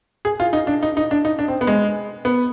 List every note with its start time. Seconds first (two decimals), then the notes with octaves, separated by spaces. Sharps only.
0.25 G#4
0.40 F4
0.53 D#4
0.67 D4
0.83 D#4
0.97 D#4
1.11 D4
1.25 D#4
1.39 D4
1.48 C4
1.61 B3
1.67 G#3
2.25 B3